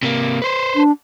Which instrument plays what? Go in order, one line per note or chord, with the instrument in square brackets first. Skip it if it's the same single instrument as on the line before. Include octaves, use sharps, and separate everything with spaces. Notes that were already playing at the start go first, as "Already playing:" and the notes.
[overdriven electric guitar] C3 A#3
B4 C5
[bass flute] D4